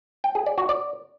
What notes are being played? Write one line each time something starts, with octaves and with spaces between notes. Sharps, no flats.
G5
G#4
D5
F#4
D5